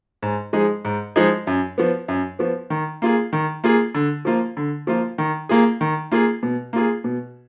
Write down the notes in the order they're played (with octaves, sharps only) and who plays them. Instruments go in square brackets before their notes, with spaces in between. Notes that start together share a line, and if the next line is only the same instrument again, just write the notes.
[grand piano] G#2
F3 G#3 D#4 G#4
G#2
F3 G#3 D#4 G#4
F#2
F3 B3
F#2
F3 B3
D#3
A#3 F4 G#4
D#3
A#3 F4 G#4
D3
F3 A#3 F4
D3
F3 A#3 F4
D#3
A#3 F4 G#4
D#3
A#3 F4 G#4
B2
A#3 F4 G#4
B2